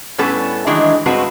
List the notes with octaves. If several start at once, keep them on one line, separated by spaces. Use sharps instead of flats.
A2 G3 B3 C#4 A4 B4
D#3 E3 F#3 G#3 A3 D4
G2 G#3 C4 F#4 B4 A5